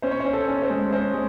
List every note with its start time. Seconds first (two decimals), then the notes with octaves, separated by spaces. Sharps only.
0.02 C#4 C5
0.11 C#5
0.20 C#4 C5
0.33 A4
0.48 C#4
0.62 C5
0.70 G#3
0.92 C#4 C5
1.13 G#3